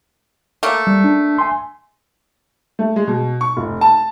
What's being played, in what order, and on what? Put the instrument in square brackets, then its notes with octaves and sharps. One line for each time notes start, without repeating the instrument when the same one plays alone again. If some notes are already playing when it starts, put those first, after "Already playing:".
[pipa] A3 A#3 F5
[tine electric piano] G3
D4
G#5 C6
[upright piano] A3
G#3
B2
C#6
F1
A5